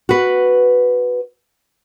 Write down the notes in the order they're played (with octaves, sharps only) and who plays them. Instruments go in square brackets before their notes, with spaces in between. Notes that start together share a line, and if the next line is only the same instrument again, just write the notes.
[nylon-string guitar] F#4 B4